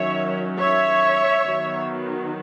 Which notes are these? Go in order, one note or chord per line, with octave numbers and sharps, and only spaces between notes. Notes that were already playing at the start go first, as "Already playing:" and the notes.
Already playing: D#3 F#3 C#4 C#5 E5
C#5 E5
D#3 F#3 B3